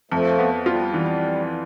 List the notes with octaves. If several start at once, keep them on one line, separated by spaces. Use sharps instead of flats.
F2 F3 A3
B3
G3 F4
E3